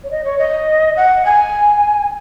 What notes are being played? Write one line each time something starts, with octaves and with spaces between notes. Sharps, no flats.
C#5
D#5
C#5
D#5
F#5
G#5